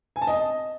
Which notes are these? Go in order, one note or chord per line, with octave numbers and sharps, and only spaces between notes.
G#5
A5
D#5